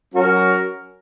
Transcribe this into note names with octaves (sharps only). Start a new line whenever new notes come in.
F#3 C#4 F#4 A#4